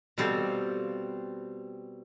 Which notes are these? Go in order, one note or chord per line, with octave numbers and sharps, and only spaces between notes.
B2 G3 C4 A4 F5